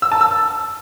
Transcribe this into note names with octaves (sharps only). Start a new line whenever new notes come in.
E6
A5
E6